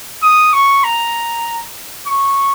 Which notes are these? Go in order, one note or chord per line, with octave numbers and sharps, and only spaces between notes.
D#6
C#6
A#5
C#6